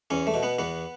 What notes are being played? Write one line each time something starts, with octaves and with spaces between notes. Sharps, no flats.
E2 C#4
A3
B2
B3
E2 B3